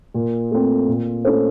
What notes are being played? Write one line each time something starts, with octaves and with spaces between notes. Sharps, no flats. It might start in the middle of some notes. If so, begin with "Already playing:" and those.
A#2
A3 C4
A#2
A3 C#4 A4 C5